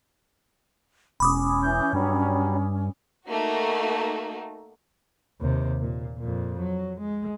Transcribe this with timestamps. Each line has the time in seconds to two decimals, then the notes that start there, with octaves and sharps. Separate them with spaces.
1.20 E1 C#4 B5 D6 D#6
1.63 E3 G6
1.93 G2 F#3 G3
3.26 A3 A#3 D#4 F#4
5.40 D#2 C3
5.81 A#2
6.19 F2 A#2
6.60 F#3
7.01 G#3